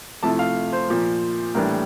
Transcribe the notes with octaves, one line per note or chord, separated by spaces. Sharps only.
C3 F3 A3 E4 A5
F5
C5
A#2 F3 A#3
A2 E3 G3 A#3 D4 A#4